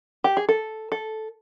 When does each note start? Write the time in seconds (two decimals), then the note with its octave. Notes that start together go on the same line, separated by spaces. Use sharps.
0.24 G4
0.37 G#4
0.49 A4
0.92 A4